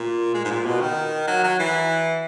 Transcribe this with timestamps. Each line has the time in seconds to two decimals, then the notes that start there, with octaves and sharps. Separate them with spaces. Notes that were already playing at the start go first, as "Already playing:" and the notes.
Already playing: A#2
0.34 G#3
0.45 G#2
0.51 A#2
0.66 B2
0.81 D#3
1.27 F#3
1.44 F#3
1.59 E3